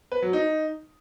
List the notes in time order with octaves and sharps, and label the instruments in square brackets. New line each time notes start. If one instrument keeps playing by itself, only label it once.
[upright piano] B4
F#3
D#4